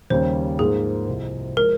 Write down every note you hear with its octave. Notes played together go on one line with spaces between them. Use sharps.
D#2 C#3 G3 C#4 C5
G#2 F3 A#3 G#4
C2 C3 F3
F3 G#3 A#4